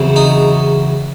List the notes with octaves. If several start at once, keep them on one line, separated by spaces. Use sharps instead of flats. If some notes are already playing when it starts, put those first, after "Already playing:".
Already playing: E2 C#3 F#3 C4
D#4